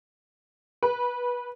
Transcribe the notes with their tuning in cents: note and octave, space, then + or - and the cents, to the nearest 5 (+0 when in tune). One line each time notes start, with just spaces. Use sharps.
B4 -20